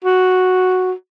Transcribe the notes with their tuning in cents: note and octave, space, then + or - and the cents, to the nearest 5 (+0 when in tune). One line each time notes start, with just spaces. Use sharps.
F#4 -5